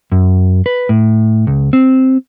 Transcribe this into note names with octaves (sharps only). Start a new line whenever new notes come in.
F#2
B4
A2
C#2
C4